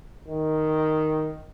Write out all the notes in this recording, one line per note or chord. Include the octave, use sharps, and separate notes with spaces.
D#3